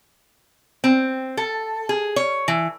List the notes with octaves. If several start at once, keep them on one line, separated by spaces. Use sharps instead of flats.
C4
A4
G#4
C#5
E3